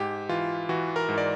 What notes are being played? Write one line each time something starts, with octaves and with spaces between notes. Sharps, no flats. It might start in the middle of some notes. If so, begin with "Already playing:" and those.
Already playing: G#2 G4
E3 F4
E3 F#4
A#4
G#2
D5